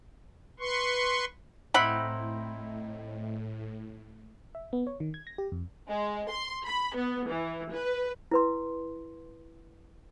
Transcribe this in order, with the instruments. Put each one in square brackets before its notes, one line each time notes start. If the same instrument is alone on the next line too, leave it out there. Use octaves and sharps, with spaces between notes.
[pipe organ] B4 C6 C#6
[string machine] A2 [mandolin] C4 D#4 E4 [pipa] F#5 B5
[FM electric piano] E5
B3
C#5
D#3
G#6
A#6
G4
F2
[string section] G#3
C6
B5
B3
E3
B4
[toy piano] E4 B4 C6